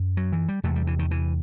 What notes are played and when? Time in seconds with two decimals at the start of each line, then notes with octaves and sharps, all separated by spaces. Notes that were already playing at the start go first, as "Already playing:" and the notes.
Already playing: F#2
0.17 F#3
0.32 E3
0.48 G3
0.63 E2 C3 A3
0.76 G3
0.87 E3
0.99 D#3
1.11 E3